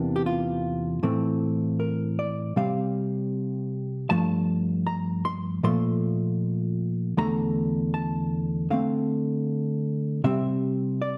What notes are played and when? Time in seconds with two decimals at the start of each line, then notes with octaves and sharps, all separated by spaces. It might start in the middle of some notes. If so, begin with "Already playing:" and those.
Already playing: E2 C3 E3 A#3 D4
0.16 G4
0.26 F4
1.03 A2 E3 A3 C4
1.80 A#4
2.19 D5
2.56 C3 G3 C4 F5
4.10 G2 F3 A3 A5
4.87 A#5
5.25 C6
5.63 A#2 F3 A3 C6
7.17 E2 D3 A3 A#5
7.94 A5
8.70 D3 A3 C4 F5
10.24 C3 G3 C4 E5
11.02 D5